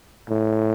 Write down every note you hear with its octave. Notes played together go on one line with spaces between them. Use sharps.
A2